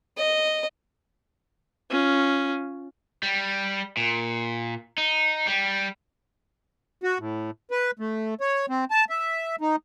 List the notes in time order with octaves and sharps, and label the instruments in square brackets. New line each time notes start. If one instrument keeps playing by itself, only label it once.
[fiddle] D#5
[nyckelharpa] C#4 F4
[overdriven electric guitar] G3
A#2
D#4
G3
[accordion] F#4
A2
B4
A3
C#5
C4
A5
E5
D#4